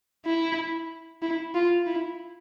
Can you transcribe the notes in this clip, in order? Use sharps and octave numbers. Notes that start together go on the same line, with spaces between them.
E4
E4
F4
E4